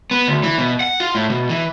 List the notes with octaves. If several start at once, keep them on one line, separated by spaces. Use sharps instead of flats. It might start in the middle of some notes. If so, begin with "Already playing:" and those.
B3
D2
E3
B2
F#5
F4
A2
B2
E3